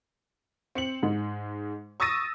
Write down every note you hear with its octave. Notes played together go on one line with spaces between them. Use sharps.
C4 C#7 F#7
G#2 G#3
C#6 D#6 E6 A6 A#6 D#7